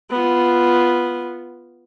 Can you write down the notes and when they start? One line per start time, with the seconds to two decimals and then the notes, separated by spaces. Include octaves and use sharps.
0.11 B3 F4